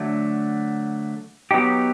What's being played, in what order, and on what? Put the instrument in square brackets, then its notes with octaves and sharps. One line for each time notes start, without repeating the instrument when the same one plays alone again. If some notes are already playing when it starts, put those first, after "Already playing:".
Already playing: [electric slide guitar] D3 F#3 A3
F#3 B3 D#4 G4